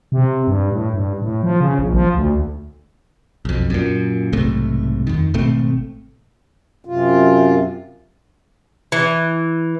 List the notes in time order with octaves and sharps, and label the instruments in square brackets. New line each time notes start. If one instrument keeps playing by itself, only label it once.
[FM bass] C3
G2
A2
G2
A2
F3
C#3
A#1
F3
D2
[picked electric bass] B1 F2
F#2 A#2
B1 G#2 C3 A3
F2 D#3
G#1 B2 A3 C4
[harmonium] F#2 C3 F4
[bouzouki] E3